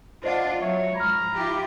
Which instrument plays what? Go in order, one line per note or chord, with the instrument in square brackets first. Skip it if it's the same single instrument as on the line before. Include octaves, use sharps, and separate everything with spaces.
[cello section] D4 F4 [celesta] C5 D#5 F#5
[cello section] F#3 [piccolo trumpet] C#5 [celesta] E5
[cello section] G#2 F3 [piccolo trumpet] A#5 [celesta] B5 F6
[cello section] E4 F4 G4